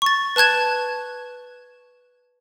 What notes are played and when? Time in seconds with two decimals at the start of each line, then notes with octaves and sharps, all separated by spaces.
0.02 C#6 A6
0.36 B4 A5 F#6 G#6 E7